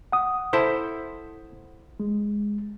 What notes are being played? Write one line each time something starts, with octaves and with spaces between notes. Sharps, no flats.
F#5 D#6
E4 A4 C5
G#3